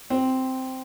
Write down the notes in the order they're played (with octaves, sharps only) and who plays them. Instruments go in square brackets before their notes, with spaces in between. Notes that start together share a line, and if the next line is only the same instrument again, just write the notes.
[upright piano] C4